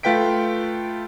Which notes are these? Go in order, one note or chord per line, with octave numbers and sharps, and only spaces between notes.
A3 F4 B4 G5 B6 D7